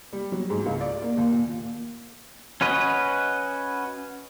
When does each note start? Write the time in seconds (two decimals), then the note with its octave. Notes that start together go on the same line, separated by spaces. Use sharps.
0.13 G3
0.32 F#3
0.50 G#2
0.66 C#2
0.81 D5
1.02 A#3
1.17 D#2
1.32 A#2
2.61 C#4 F#4 B4 D#5